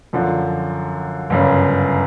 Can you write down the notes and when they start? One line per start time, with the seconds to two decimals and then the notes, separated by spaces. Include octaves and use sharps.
0.13 F#2 D3 F3
1.30 G1 F#2 C#3